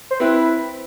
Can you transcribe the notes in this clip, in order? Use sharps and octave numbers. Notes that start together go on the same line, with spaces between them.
C5
C4 E4 B4